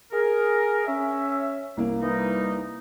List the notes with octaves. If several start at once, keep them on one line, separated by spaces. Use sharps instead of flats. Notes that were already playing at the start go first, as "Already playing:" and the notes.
G#4 A#4
C#4 E5
C2 A#3
E3 G3 D#4